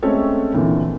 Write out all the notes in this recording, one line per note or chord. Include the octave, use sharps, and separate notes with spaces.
G#3 A3 C4 C#4 A4 C#5
F2 A#2 D3 E3